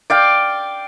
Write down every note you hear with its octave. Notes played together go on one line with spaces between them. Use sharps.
D5 F5 G5